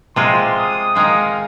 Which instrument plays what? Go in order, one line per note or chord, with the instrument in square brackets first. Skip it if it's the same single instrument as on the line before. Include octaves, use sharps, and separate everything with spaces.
[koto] C3 G#3 F4 [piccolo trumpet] C6
[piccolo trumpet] D#6
[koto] D#3 G#3 D#4 A#4 [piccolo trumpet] F5